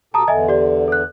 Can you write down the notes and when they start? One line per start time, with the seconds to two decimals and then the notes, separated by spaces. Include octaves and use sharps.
0.14 B2 G4 A4 A5 A#5 D#6
0.28 E2 D3 D#5 E5 G#5
0.48 G4 D5
0.88 A4 F#6